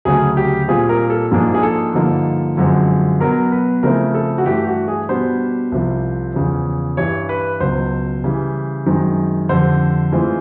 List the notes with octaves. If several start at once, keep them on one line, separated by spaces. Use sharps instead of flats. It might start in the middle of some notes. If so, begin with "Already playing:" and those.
D2 C#3 F#3 A3 C#4 G#4
G4
A#2 G3 C4 F4 G#4
A#4
A4
G#2 F3 A#3 D4 F4 G#4
G#4
A4
G2 D3 F3 A#3 D#4
F#2 D3 F3 G#3 C4
B2 F#3 B3 A#4
B4
C#3 F3 A3 C4 E4 A#4
A4
F#4
G2 E3 A3 G4
F#4
G#4
B2 G3 B3 D4 C5
C2 C3 F3
E2 C#3 F3
G2 E3 G3 C#5
B4
C#2 B2 F#3 C5
C#3 E3 G3
F#2 D#3 G#3 C4
F2 D3 G3 C5
A2 E3 G#3 C4 F4